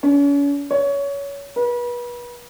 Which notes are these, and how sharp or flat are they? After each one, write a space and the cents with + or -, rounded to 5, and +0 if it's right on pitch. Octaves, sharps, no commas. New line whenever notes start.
C#4 +40
C#5 +20
B4 -35